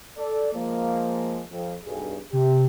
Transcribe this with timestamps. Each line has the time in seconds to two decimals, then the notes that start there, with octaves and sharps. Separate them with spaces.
0.17 A4 D5
0.53 F3 G#3 A#3
1.50 F2
1.85 B1 G2 G#4
2.33 C3 G4